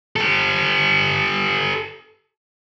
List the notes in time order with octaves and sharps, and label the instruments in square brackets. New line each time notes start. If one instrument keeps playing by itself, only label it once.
[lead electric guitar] G4 A4